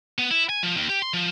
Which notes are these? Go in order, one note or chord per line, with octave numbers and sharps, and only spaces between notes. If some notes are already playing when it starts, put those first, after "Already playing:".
B3
E4
G#5
F3
D#2
G4
C6
F3